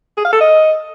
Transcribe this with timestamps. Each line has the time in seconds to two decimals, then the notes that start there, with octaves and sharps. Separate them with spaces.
0.17 G#4
0.25 F5
0.33 A4
0.41 D#5